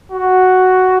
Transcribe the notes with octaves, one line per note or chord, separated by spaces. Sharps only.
F#4